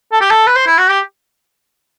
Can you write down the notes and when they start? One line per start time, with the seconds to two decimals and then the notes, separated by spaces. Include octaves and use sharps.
0.13 A4
0.21 G4
0.31 A4
0.47 B4
0.56 C5
0.67 E4
0.78 F#4
0.90 G4